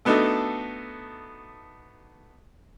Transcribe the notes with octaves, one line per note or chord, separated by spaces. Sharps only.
A3 B3 D4 D#4 F#4 A4